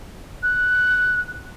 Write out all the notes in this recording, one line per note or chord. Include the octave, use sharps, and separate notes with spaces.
F#6